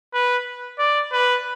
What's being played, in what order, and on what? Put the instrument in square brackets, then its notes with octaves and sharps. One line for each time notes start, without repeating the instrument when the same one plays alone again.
[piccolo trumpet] B4
D5
B4